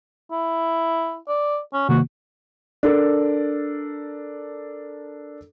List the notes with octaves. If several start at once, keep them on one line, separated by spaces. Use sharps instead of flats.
E4
D5
C#4
C3 D#3 A#3 F#4
D4 A4 A#4